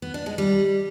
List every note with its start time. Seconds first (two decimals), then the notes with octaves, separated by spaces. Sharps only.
0.02 B3
0.14 D4
0.26 G#3
0.38 G3